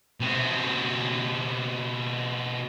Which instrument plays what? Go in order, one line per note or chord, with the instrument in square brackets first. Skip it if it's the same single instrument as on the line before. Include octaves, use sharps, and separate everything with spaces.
[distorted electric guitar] B2 C4